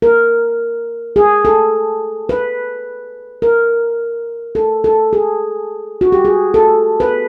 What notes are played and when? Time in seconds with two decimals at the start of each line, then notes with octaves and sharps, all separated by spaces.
0.02 A#4
1.16 G#4
1.45 A4
2.29 B4
3.42 A#4
4.55 A4
4.84 A4
5.13 G#4
6.01 F#4
6.12 G4
6.25 G#4
6.54 A4
7.00 B4